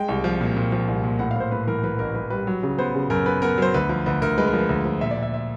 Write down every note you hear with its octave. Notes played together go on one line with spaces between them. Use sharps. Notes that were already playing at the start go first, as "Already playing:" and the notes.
Already playing: G#3 G5
C2
F3
A#2
A#2
F3
C2
A#2
A2 F#5
F5
A2 C5
A2 B4
E3 A#4
E3 B4
A1 A#4
E3 B4
G3 B4
F#3
C#3
B3 C5
C#3
F#2 A#4
B3 B4
B3 A#4
F#3 C5
D2 B4
F3
D2 B4
D2 A#4
G#3 B4
A#4
F3
B4
D2
F3
A#2 E5
D5
A#2
E5
E5